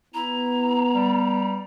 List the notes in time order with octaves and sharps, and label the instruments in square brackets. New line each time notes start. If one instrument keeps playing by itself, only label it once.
[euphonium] B3 [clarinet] E4 [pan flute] A#5
[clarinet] G3